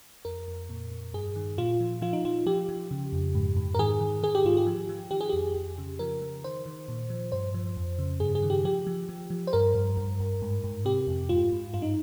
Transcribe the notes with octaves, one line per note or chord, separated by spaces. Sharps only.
F2 A#4
F2
A#2
A#2
G2 G#4
D#3
A#2 F4
F3
F3 F4
D#4
F3 F4
F3 G4
F3
C#3
F2
G#2
G#2
A#4
D#3 G#4
D#3
D#3 G#4
G4
G#2 F4
G4
F3
F3
D#3 G4
G#4
F2 G4
F2
C#3
F3 A#4
F3
D#3 C5
D#3
A#2
F3
G2 C5
F3
F2
C#3
G2 G#4
G#4
D#3
G4
F3 G4
F3
F3
F3
C5
G2 A#4
G2
G2
G2
G#2
G#2
C3 G4
F2
G#2 F4
G#2
G2 F4
D#4